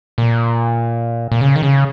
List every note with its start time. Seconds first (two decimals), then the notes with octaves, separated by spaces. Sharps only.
0.18 A#2
1.32 A#2
1.41 C#3
1.56 D#3
1.63 C#3